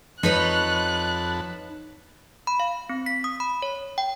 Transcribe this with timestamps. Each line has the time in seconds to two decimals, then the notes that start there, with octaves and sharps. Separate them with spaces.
0.23 F2 D#4 B4 C#5 A5 B5 F#6
2.47 B5
2.60 F5
2.89 C4
3.06 B6
3.24 D#6
3.40 B5
3.62 C#5
3.98 G5